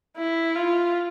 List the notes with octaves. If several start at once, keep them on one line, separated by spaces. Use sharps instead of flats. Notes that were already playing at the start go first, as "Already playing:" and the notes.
E4
F4